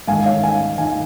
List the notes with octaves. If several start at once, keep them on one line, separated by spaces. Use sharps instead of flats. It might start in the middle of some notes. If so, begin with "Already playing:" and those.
G#2 D#3 F5 G#5
C#5 F5
F5 G#5
D#3 F5 G#5